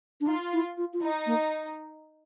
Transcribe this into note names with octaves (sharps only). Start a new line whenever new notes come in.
D4
D#4 F4
E4
F4
F4
D#4 E4
A#3